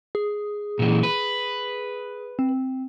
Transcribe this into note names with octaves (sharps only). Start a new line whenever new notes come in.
G#4
A#2 E3
B4
C4